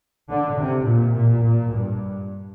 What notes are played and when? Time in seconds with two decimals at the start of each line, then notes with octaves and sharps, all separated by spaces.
0.30 D3
0.59 C3
0.86 A#2
1.15 A#2
1.43 A#2
1.72 G2